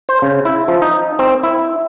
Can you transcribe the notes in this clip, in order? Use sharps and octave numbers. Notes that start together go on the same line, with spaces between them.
C5
C#3
E4
F3
D#4
C4
E4